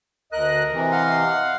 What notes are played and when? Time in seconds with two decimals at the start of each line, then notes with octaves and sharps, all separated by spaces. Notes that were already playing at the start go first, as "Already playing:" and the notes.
0.33 D2 A#4 D#5 F#6
0.72 C3 E3
0.92 F5 F#5 C6